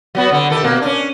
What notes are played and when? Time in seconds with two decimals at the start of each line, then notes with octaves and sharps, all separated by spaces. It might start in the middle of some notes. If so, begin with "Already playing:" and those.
0.15 F#3 B3 F#4
0.32 D3
0.50 D#3 G4 A4
0.64 B2 A#3
0.81 C#4 D4